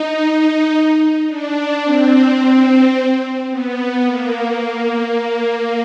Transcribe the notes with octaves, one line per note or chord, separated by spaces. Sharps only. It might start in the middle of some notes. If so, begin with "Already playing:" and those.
Already playing: D#4
D4
C4
C4
B3
A#3
A#3